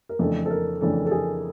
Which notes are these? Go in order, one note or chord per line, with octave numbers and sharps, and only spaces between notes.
A#4
F2 C#3 E3 A3 D4 A4
A4
A#4
F2 C#3 E3 A3 D4 A4
A4
G#4